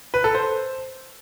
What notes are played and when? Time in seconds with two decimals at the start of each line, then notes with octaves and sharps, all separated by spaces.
0.14 B4
0.24 A4
0.35 C5